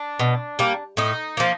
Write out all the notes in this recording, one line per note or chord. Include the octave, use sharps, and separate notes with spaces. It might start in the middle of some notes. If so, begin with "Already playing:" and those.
Already playing: D4
B2
G3 A#3
A2 D#4
F3 A#3